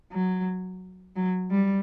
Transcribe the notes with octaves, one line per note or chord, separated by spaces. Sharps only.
F#3
F#3
G3